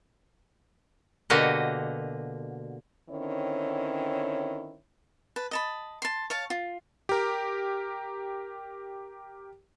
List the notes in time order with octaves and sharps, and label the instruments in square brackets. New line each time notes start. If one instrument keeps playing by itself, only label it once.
[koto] B2 D3 A#3 F#4 G4 D#5
[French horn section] D3 D#3 C4 C#4 E4 C#5
[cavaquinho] B4 A5
D#5 A5 B5
A5 C6
C#5 F5 A5
F4
[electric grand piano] G4 A#4